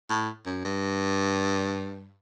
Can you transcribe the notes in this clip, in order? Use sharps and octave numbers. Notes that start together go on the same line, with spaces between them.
A2
F#2
G2